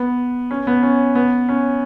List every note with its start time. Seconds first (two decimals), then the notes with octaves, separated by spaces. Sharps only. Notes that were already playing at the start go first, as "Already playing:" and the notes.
Already playing: B3
0.51 C#4
0.67 B3
0.83 C#4
1.15 B3
1.49 C#4